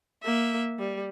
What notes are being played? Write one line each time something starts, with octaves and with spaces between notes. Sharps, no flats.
A#3 E5
G3